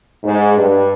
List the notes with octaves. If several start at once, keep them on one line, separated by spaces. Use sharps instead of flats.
G#2
G2